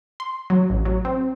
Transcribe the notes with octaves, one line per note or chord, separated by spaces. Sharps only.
C6
F#3
A1
F#3
C4